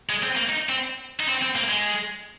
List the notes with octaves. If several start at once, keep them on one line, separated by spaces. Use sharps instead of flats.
G#3
C4
A#3
D#4
C4
D#4
C4
C4
A#3
G#3